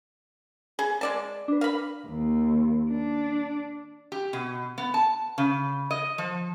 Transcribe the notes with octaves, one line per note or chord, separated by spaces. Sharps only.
G#4
G#3 D5 A5 E7
D4 B4
A#4 F5 B5
D#2
D4
G4
B2
B3
A5
C#3
D#5
F3